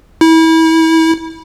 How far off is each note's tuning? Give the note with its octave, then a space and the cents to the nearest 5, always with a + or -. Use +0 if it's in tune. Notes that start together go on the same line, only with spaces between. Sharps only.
E4 -30